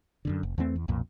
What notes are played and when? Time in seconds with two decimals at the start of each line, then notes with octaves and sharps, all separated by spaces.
0.25 F#2 A2 D3
0.43 F1
0.58 E2 E3 A3 C4
0.76 E2
0.88 B1 F2 A#2